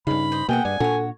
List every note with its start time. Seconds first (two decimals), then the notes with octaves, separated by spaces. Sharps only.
0.07 G2 C#3 D#4 F5 B5
0.32 C5 D#5
0.49 B2 A#3 G#4 E5 F#5 G5
0.65 G2 D5 G#5
0.80 A#2 D4 F#4 A4 C#5